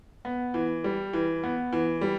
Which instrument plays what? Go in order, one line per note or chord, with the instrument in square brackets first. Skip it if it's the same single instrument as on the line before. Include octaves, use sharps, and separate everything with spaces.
[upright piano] B3
E3
G3
E3
B3
E3
G3